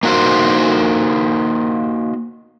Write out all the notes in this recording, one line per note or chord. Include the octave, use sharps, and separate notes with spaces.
A#3 D#4 F#4 A#4 C5